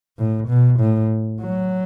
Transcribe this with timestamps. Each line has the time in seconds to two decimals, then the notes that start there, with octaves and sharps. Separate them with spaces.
0.18 A2
0.48 B2
0.80 A2
1.41 F#3